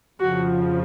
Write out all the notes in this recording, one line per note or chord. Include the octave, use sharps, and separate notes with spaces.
F2 C#3 F3 F#4